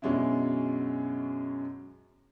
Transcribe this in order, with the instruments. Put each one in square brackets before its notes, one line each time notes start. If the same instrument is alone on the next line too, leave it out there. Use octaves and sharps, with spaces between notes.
[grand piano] F#2 B2 G#3 C#4 D4 E4